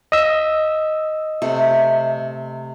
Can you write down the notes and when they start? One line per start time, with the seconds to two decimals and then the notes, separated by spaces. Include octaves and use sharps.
0.12 D#5 E6
1.42 C3 A3